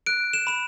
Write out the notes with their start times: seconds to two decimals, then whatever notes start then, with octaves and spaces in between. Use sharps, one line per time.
0.06 F#6 D7
0.33 E7
0.47 B5 E7